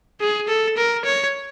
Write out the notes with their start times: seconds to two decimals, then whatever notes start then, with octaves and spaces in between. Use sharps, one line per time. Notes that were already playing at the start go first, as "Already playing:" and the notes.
0.20 G#4
0.48 A4
0.77 A#4
1.05 C#5